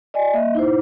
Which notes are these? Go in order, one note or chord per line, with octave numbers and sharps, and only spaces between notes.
D5 D#5 G#5
A#3 D#5 E5
D#4 E4 C5